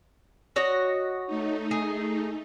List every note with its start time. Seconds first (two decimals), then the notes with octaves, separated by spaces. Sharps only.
0.56 F#4 C#5 D#5
1.27 A3 D#4
1.71 G#4